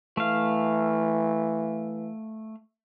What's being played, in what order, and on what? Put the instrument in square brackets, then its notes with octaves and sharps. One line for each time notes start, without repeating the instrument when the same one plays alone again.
[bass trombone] E3 [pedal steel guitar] A3 F5